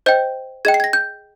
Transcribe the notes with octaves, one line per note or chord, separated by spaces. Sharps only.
C5 D#5 G5 G6
G#4 D#5 G5 G#6
C7
G#6
A#6
G6